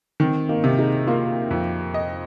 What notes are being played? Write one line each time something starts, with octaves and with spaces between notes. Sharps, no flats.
D#3 C4
A#3 D#4
C3
D#4 G#4
A#3 F4 A#4
F2
D#5